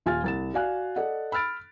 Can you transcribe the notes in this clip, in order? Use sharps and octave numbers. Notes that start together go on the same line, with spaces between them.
D#1 F4 G#5 F6 A6
C2 A6 E7
F#4 D5 F5 G#5 F#6
A4 D5 D#5 F#5
B5 E6 F6 A6 D7